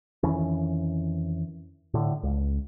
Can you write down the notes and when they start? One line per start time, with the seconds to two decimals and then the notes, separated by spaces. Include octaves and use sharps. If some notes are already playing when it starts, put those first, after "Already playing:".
0.23 F2 D#3 E3 C#4
1.94 A2 D3
2.23 C#2